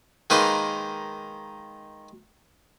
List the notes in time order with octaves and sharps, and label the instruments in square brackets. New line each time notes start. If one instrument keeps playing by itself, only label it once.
[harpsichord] D#3 G#3 A#3 D#4 B4 C5